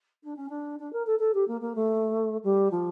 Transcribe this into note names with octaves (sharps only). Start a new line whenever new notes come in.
D4
C#4
D4
D4
A#4
A4
A4
G4
A#3
A#3
A3
G3
F3